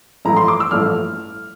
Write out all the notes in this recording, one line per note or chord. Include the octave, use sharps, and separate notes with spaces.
A1 G2 F3 A3 E4 A#5
C6
D6
E6
A1 G2 F3 A3 E4 F6